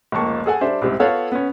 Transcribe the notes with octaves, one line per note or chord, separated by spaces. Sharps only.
F1 C#2 A#3 A5 C#6
G#4 A4 F#5 G#5
G3 D4 C5 E5
C2 G#2 C3
B3 F4 A4 C#5 F5 F#5
B3 C#4